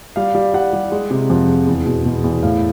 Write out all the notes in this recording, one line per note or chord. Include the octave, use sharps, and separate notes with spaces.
G3 F5
G3
G3 F#5
G3
G#3
C3
F2
G#3
E2
B2
B2
E2
A2 F5